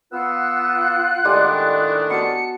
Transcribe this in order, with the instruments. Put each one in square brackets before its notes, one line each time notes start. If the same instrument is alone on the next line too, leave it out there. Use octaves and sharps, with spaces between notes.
[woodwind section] B3 E6 [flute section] F4 F#5 [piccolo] F#6
[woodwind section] A2 D#3 D4 [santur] G3 G#3 G4
[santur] B3 F#4 A5 [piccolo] C#7